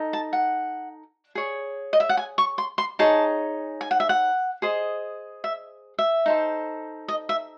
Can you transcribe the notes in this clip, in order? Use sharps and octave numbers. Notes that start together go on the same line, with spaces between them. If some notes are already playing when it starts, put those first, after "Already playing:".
Already playing: D#4 A4
A5
F#5
G#4 C#5
D#5
E5
F#5
G#5
C#6
C6
C6
D#4 G#4 C#5 A5
G#5
F#5
E5
F#5
G#4 C5 D#5
E5
E5
D#4 A4 C5
D#5
E5